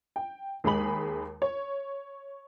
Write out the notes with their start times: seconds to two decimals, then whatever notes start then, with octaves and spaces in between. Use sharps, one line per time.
0.16 G5
0.64 D#2 G#3 G#4 B5 F#7
1.42 C#5